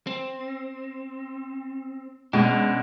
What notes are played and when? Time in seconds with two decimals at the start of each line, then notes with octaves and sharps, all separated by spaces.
0.07 C4
2.33 B2 G#3 C#4 D4